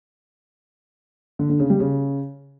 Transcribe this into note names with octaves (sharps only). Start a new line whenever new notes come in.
D3
D3
C#3
G3
C#3